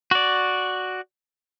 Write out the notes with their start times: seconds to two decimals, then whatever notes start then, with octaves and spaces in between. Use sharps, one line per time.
0.11 F#4 D5